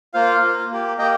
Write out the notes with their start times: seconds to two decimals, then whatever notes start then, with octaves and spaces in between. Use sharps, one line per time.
0.14 A#3 F4 C5 F5
0.42 A#3 F4
0.71 A#3 G4
0.98 A#3 G4 D#5 G5